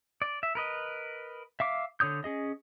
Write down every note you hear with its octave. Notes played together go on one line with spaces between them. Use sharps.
D5
E5
A#4 B4 D#5
E5 F5 D6
D3 C#5 D#6 G6
C#4 G#4 D#5